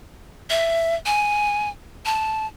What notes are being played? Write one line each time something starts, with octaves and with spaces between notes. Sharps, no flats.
E5
G#5
A5